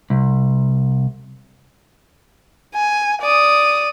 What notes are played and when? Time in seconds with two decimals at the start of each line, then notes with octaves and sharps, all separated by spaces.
0.10 C2
2.74 G#5
3.22 D5 D#6